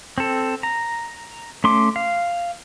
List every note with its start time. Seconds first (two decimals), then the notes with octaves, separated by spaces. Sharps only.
0.18 C4 A4
0.63 A#5
1.64 A3 C#4 C6 D6
1.96 F5